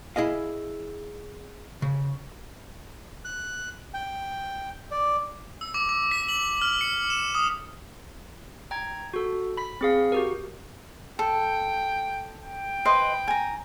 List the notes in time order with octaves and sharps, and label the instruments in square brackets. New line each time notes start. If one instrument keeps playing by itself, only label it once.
[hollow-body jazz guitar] E4 G#4 D#5 F5
C#3
[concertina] F#6
G5
D5
[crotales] E6
D6
D6
B6
F#7
F6
C#7
E7
D#6
[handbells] G5 A#5 G#6
F#4 A4
B5 B6
C4 G#4 F5
F#4 G4 A#4
[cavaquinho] A4 [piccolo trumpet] G5
[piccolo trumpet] G5
[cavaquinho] B4 C5 D#5
G#5 A#5